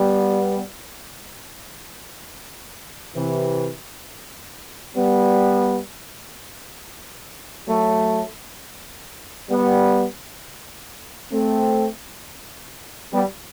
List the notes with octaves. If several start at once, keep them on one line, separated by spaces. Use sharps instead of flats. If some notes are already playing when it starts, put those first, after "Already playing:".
Already playing: G3 B3
C3 E3
G3 B3
F#3 A3
G3 B3
A3 C4
G3 B3